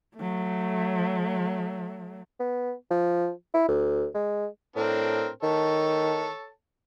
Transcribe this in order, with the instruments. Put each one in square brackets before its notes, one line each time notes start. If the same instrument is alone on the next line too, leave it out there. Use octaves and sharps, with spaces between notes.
[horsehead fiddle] F#3 A3
[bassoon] B3
F3
E4
D2
G#3
[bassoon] A2 [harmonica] C4 D4 A#4
[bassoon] D#3 [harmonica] A4 C#5 A5